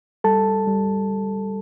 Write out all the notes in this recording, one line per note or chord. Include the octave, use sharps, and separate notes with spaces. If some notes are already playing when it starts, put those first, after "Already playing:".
G3 A4 A5
G3